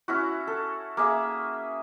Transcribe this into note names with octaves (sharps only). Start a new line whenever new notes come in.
C#4 E4 F#4
A4
A#3 G#4 E5